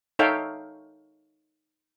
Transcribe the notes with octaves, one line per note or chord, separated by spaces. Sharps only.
D#4 A4 C#5 E5 F5 G5